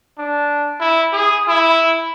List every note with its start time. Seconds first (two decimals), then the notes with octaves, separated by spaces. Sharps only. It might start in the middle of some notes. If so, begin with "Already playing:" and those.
0.18 D4
0.81 E4
1.13 G#4
1.48 E4